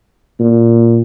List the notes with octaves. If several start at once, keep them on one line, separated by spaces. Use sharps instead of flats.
A#2